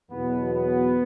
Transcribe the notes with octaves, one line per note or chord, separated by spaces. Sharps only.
E2 B2 F#3 B3
B3